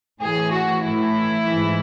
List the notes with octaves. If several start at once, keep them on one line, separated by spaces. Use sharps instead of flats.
A2 E3 G#4
F#4
A2 E3 E4
E3
G#2